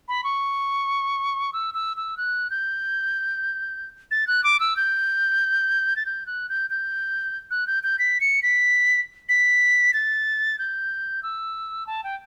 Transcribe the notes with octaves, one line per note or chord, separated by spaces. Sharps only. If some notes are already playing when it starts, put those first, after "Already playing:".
B5
C#6
E6
E6
E6
F#6
G6
A6
F#6
D6
E6
G6
A6
G6
F#6
G6
G6
F#6
G6
G6
B6
C#7
B6
B6
A6
G6
E6
A5
G5